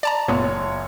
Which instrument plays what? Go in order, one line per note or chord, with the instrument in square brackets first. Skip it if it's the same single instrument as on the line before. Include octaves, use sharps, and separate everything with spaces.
[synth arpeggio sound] D5 A5 A#5
[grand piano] F#1 C#5 [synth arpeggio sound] A#2 B3